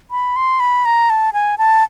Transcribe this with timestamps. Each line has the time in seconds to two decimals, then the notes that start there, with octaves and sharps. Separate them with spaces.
0.11 B5
0.36 C6
0.60 B5
0.85 A#5
1.10 A5
1.33 G#5
1.58 A5